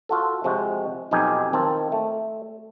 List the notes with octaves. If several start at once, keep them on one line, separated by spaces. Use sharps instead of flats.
F4 F#4 A4
C3 F3 G#3 F#4
B1 F2 B2 D#4 G4 G#5
D#3 C4 F4 A5
A3